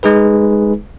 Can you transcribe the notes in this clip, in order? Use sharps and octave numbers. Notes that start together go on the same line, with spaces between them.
G#3 D#4 G#4 B4